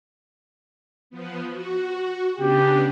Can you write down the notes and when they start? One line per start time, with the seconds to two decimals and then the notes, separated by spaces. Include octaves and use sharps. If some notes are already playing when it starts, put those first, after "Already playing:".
1.10 F3 B3
1.51 F#4
2.37 C#3 B3 D4 G4